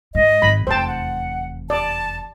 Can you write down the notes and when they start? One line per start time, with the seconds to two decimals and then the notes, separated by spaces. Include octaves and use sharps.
0.15 G#2 D#5
0.42 G#1 B5
0.67 F1 E2 C5 G5 A5
0.87 F#5
1.70 D5 A5